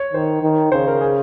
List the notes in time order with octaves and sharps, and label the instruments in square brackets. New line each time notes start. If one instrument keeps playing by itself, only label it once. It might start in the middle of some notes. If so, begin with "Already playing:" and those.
Already playing: [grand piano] C#5
[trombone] D#3 [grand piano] C5
[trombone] D#3
[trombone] C#3 [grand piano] C5
[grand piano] A#4
G#4